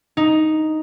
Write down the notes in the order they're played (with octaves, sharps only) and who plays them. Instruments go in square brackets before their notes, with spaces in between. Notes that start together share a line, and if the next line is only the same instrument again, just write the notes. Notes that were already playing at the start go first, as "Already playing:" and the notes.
[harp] D#4